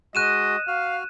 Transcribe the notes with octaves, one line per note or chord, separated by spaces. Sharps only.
G#3 F#4 D#5 F#6 D#7 E7
F#4 F5 F6